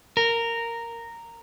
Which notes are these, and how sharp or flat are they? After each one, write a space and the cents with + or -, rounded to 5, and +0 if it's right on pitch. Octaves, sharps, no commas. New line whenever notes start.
A#4 -10